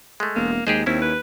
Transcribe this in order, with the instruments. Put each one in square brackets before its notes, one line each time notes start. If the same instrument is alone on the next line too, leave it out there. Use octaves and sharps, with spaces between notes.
[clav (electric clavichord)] G#3 A3
[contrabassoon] E1 [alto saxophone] A#3
[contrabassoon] D#2 [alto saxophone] G#3 [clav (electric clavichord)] G4 G#4 C5
[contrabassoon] D#2 [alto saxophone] C4 [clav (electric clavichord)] C#4 E4
[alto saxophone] B4